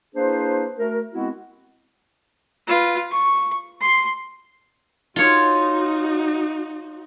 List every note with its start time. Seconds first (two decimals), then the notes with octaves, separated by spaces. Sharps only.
0.15 A#3 D4 E4 G#4 B4 C5
0.79 A3 F#4 A#4
1.14 G#3 B3 C4 E4 F#4
2.67 F4 B4
3.11 C#6
3.81 C6
5.16 D#4 F4 F#4 C#5